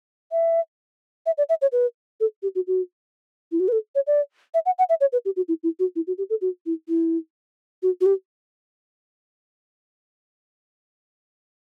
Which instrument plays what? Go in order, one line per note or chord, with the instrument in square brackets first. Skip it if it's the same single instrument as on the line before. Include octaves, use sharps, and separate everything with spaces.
[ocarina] E5
E5
D5
E5
C#5
B4
A4
G4
F#4
F#4
E4
F#4
B4
A4
C#5
D5
E5
F#5
F#5
E5
C#5
B4
G4
F#4
E4
E4
F#4
E4
F#4
G4
A4
F#4
E4
E4
F#4
F#4
G4